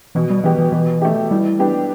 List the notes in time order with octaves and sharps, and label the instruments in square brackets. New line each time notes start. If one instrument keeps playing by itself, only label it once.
[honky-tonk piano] B2 [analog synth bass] E3
[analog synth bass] G3
[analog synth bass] E3 [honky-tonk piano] B3 G4
[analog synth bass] E3
[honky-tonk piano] B2 [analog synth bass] E3
[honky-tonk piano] A3 G4
[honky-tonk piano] E3 [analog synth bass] G3
[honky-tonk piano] B3 D4 G4